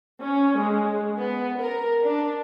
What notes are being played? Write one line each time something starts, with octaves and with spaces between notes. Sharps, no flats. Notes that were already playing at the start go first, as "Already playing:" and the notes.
C#4
G#3
B3
A#4
D4